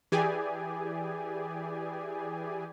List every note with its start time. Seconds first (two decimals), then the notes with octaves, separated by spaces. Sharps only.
0.12 E3 G4 G#4 D5 G#5